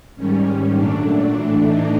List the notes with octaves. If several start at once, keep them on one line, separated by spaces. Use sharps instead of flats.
G#2 D#3 G3 C#4
A#2 F#3 A3 D4
A2 E3 A3 D4
D#4